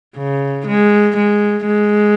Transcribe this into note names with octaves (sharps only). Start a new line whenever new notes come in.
C#3
G#3
G#3
G#3